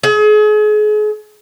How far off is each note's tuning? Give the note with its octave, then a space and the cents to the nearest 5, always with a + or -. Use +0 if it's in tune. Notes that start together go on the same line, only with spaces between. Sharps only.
G#4 +35